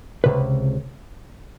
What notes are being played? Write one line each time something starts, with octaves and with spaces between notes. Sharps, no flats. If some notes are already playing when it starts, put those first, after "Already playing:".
C#2 C3 B4